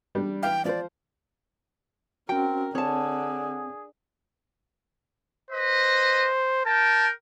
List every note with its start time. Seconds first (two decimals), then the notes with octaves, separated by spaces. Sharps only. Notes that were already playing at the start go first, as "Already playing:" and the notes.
0.15 G3 D4
0.43 E3 F5 G5
0.65 F3 C5 D5
2.29 C4 C#4 F#4 A#4 G5
2.75 D3 C4 G#4 C#5 A5
5.51 B4 C5 D#5
6.66 A#4 G5 A5